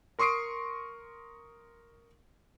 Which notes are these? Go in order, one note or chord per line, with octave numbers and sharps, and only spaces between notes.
A#4 C6 C#6 D#6 C7 D7